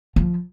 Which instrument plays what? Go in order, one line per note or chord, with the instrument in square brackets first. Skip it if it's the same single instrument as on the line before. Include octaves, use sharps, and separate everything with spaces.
[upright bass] F3